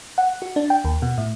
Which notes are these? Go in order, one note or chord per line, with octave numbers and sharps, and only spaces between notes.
F#5
F#4
D4
G5
D#2
B2
A2